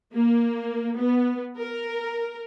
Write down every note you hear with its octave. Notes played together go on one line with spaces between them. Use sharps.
A#3
B3
A#4